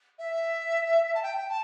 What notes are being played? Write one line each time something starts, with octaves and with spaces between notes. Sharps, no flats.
E5
A5
G5
G5
A5